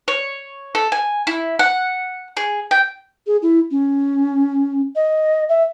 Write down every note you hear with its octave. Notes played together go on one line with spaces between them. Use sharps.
C#5
A4
G#5
E4
F#5
G#4
G5
G#4
E4
C#4
D#5
E5